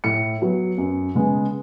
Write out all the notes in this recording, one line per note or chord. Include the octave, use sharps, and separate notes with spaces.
A2 C#7
F#3 B3
F#2
C#3 G#3 B3